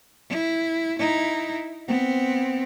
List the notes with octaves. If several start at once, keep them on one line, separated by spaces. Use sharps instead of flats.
E4
D#4 E4
B3 C4